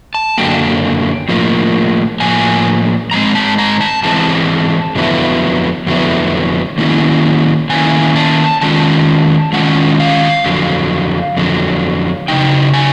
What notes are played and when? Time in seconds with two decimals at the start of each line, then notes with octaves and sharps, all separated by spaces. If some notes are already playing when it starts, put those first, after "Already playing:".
0.15 A5
0.38 F#2 D3 F#3 A#3 G5
1.29 A2 F3 A#3
2.20 A2 F3 A#3 G#5
3.11 G#2 E3 G#3 C4 A#5
3.35 A5
3.58 A#5
3.81 A5
4.03 G#2 E3 G#3 C4 A5
4.95 F2 D3 F#3 B3 E4
5.87 F2 D3 F#3 B3 E4
6.78 D#3 F#3 A#3 C#4 E4
7.69 D#3 F#3 A#3 C#4 E4 G#5
8.16 A5
8.61 D#3 G#3 C#4 F4 A5
9.53 D#3 G#3 C#4 F4 F#5
10.00 F5
10.44 F2 D3 F#3
11.37 F2 D3 F#3
12.28 C#3 F#3 A#3 D#4 G5
12.73 G#5